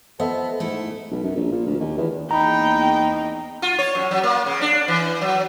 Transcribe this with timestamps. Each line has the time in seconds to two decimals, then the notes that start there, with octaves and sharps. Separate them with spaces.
0.20 F2 B3 A4 C5 D#5 E5
0.60 G#2 A3 E4
1.11 B1
1.24 F#2
1.36 A#1
1.52 A#2
1.66 D2
1.80 D#2
1.98 E2
2.31 E2 A#3 C4 D#4 G5 A#5 B5
3.62 F4
3.79 C#5
3.95 F#2
4.11 F#3
4.24 A#3
4.46 C#3
4.62 D4
4.88 E3
5.21 F#3